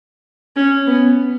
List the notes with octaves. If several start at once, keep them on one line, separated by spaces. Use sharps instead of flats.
C#4
B3